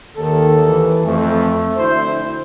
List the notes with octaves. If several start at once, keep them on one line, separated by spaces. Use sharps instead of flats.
D#2 D#3 A4
E3
F2 A3
D2 E4 C5